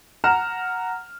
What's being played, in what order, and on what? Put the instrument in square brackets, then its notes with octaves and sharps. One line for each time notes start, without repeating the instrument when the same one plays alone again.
[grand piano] F#5 A#5 F6 E7